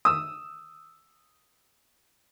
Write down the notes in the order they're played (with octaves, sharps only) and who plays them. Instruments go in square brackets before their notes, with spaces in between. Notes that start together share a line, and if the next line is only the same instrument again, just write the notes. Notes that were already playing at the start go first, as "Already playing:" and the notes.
[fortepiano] D#6 E6